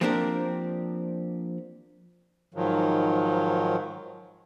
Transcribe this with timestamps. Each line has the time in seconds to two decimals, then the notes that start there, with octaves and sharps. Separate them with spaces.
0.01 F3 A#3 C4 D4 G4 A#4
2.54 G#2 D#3 F3 F#3